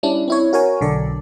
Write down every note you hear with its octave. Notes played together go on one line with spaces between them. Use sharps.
G3 C#4 D4 E4
C4 E4 C#5
F#4 A#4 C#5 G#5
B1 D3 A4 D5